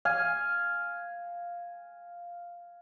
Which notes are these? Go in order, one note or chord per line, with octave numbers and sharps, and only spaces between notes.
F5 G#5